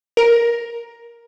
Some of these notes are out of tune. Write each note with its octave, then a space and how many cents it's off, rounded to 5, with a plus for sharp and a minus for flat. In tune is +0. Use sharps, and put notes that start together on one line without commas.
A#4 +10